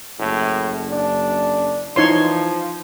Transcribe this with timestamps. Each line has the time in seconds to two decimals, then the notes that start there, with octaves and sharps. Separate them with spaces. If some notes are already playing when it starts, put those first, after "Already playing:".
0.19 F#1 A2
0.90 D4
1.96 E3 F3 D#4 C#5 C6